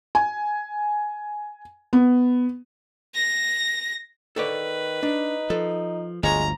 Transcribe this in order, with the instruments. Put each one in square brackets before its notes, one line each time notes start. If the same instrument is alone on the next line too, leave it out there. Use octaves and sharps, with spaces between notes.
[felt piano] G#5
B3
[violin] A#6
[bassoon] D#3 [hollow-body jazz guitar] A4 C#5 D5 [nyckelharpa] B4
[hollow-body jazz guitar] D4 [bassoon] D#4
[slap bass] F3 [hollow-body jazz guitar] A4
[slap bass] G1 D2 [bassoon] G#3 [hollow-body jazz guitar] F4 C#5 [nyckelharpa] A#5